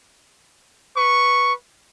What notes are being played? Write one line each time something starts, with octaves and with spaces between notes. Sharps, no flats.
B4 C#6